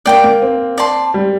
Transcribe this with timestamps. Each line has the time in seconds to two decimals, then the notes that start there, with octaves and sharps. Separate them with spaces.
0.06 A#3 D5 G5 D6
0.24 A#3
0.42 C4
0.78 D5 A5 C6
1.14 G3